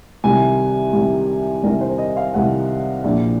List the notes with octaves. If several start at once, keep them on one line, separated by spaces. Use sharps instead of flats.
C2 C3 D#3 G#5
C2 C3 D#3
C2 C3 D#3 A#4
C5
D#5
F5
C2 C3 D#3 F#5
A#1 A#2